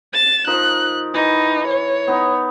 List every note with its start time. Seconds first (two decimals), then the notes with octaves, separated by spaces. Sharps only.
0.13 A6 E7
0.47 F3 D#4 A#4 F#6
1.14 E3 D#4
1.67 C#5
2.07 B3 D#4